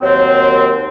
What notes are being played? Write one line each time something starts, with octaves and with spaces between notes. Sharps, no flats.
D#2 F#3 C4